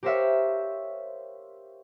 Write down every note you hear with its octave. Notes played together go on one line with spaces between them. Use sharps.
G4 A#4 C5 C#5 E5 F5